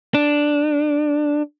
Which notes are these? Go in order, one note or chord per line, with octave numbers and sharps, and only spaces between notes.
D4